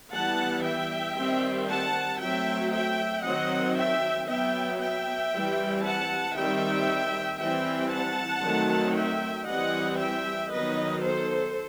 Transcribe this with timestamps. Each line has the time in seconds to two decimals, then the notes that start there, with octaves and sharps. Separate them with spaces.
0.13 E3 G3 B3 F#5 A5
0.65 E5 G5
1.16 D#3 G3 C4
1.68 F#5 A5
2.21 F#3 A3 C4 E5 G5
2.72 E5 G5
3.24 D#3 F#3 C4 D#5 F#5
3.76 E5 G5
4.28 F#3 B3 E5 G5
4.80 E5 G5
5.32 E3 G3 C4
5.83 F#5 A5
6.36 D#3 G3 C4 E5 G5
7.39 E3 G3 C4 E5 G5
7.91 F#5 A5
8.43 D#3 F#3 A3 C4
8.95 E5 G5
9.46 E3 G3 C4 D#5 F#5
9.99 E5 G5
10.50 D#3 F#3 B3 B4 D#5
11.03 A4 C5